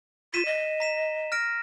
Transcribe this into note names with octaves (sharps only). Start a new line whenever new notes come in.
F4 B6 D#7 E7
D#5
A#5 B6 E7
F6 A#6 D7